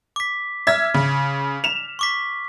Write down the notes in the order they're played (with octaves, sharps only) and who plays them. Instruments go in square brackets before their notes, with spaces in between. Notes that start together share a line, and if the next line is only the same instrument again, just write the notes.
[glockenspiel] D6 B6
[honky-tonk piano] E5 G#6 [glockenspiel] F6 B6
[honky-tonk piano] C#3
E7 F7
[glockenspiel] C#6 D6 B6